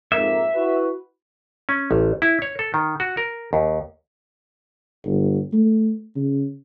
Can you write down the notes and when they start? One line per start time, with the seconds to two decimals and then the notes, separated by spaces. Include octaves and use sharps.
0.12 F2 G#2 A#3 E5
0.54 E4 F#4 B4
1.69 C#4
1.91 A1
2.22 E4
2.42 C#5
2.59 A4
2.74 D#3
3.00 F#4
3.17 A#4
3.53 D#2
5.05 G1
5.53 A3
6.16 C#3